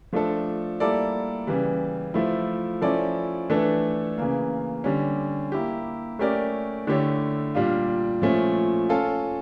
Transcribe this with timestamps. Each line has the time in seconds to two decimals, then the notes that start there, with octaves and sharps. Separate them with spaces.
0.13 F3 A3 D4 A4
0.80 G3 A#3 E4 A4 D5
1.47 C#3 E3 G3
2.14 F3 A3 E4
2.82 F3 C#4 E4 A4 D5
3.50 E3 A3 D4 A4
4.18 C#3 E3 A#3
4.84 D3 G3 C#4
5.52 A#3 E4 G4
6.19 A3 C#4 G4 A#4 D5
6.87 D3 A3 E4 G4 C#5
7.55 A#2 G3 D4 F4
8.22 A#2 F3 A3 C#4
8.89 C#4 F4 A4